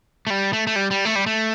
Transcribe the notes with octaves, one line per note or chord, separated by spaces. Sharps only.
A3
G3
A3
A3
G3
G3
A3
G3
A3